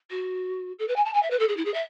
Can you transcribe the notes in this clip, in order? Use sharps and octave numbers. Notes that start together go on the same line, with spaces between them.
F#4
A4
B4
G#5
A5
G#5
E5
B4
A4
G#4
E4
G#4
E5